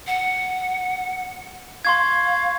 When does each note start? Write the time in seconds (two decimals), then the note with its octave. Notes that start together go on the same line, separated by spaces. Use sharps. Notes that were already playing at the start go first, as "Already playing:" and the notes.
0.07 F#5
1.85 F5 C6 C#6 G#6